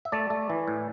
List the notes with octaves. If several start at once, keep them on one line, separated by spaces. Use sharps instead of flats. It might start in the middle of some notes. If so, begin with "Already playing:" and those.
E5
A3 D5
A3
E3
A2